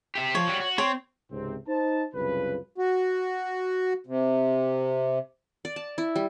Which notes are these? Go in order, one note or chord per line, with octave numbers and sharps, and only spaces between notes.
G4 E5
F3 C#5
G3 F#4
F#4
C4 C#5
C#2 G#2 C3 C4
D#4 C5 A5
C2 F#2 C#3 F4 B4
F#4
C3
D5
A5
E4
G3